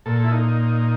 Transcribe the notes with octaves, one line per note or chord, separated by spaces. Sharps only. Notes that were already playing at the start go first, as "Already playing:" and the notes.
A#2 A4
E4
D#4